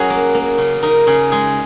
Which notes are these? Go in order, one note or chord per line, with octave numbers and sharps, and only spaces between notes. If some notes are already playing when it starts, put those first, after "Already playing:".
Already playing: F#3 C#4 F#4 G#4 A#4
A#3
A#3
C#3
D#4 A#4
C#3 G#4
G#3 G#4